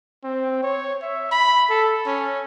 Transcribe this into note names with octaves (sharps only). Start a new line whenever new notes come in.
C4
C#5
E5
B5
A4
C#4